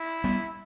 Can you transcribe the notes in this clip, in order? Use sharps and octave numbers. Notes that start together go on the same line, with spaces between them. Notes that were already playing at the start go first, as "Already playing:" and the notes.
Already playing: E4
G3 B3